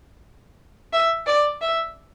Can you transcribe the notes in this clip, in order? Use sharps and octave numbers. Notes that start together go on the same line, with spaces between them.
E5
D5
E5